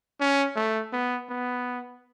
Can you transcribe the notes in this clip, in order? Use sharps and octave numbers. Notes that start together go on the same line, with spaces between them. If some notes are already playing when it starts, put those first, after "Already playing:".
C#4
A3
B3
B3